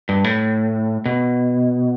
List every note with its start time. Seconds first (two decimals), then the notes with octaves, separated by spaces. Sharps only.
0.09 G2
0.24 A2
1.06 B2